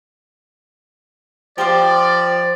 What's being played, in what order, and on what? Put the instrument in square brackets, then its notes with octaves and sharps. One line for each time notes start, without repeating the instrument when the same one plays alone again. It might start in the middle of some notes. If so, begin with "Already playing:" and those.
[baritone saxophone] F3 [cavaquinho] G4 C5 F5 [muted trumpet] D5